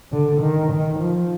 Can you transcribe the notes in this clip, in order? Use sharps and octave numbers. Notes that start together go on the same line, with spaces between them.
D3
D#3
D#3
F3